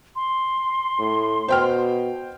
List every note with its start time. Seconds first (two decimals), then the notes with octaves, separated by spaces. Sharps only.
0.16 C6
0.99 A2
1.48 B2 C5 G5 F6